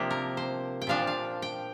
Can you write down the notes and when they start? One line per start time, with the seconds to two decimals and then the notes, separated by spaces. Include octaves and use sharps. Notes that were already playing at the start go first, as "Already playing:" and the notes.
Already playing: C3 F3 A#3 D4 G4
0.10 A#4
0.37 C5
0.81 G5
0.87 A#2 F3 D4 F5
1.07 F5
1.42 G5